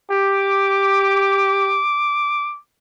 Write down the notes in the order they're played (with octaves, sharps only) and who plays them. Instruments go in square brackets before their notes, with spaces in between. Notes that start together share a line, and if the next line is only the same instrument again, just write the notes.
[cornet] G4 [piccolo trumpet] D6